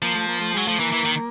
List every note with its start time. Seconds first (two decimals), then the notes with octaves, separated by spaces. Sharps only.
0.02 F3 A#3
0.15 A3
0.28 A#3
0.41 A3
0.54 F#3 G#3
0.67 F3 A3
0.79 E3 A#3
0.92 E3
1.05 D#3